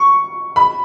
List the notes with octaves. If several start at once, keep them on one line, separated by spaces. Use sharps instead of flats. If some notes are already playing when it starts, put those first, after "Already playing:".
Already playing: C#6
B5